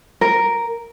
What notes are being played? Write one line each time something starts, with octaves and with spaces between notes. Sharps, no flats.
A#4